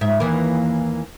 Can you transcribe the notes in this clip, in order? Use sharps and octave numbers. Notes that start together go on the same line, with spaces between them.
G#2 E5
D#2 E3 A#3